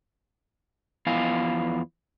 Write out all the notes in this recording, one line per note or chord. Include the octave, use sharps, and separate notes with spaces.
E2 F3 B3 E4 F5 G#5